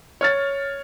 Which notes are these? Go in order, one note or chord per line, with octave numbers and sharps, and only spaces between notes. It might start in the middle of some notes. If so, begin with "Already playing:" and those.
C#5 F6 A6